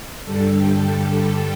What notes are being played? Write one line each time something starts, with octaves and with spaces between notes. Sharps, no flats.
G2 D3 G3 A4
G5